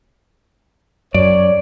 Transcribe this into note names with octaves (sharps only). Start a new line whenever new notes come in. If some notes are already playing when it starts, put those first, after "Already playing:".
F#2 C#5 D5